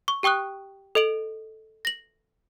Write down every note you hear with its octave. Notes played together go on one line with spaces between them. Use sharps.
C#6
G4 G5 C#6 D#6 F#6
A4 D#5 D7 F#7
A#6 F#7